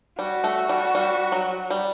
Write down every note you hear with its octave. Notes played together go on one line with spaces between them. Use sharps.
G3 F#4
A3
G3
G3
F#3
G3